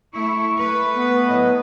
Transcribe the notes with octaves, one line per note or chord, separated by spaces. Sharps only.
A3 E4 C#6
A3 B4
B3
A2 F#3 D#5